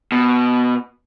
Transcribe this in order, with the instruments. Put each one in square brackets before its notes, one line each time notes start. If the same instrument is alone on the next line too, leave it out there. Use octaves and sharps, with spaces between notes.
[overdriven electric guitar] B2